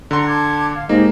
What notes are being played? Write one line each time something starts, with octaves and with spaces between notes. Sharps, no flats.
D3 F#5 A#5 C6
A5 D6 G#6
F5
G#2 A#3 G4 D#5